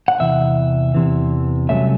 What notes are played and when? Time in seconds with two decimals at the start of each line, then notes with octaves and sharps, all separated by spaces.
0.08 F#5
0.20 E2 C3 E3 E5
0.95 E2 C3 E3
1.69 C2 C3 F#3 A3 C#4 E5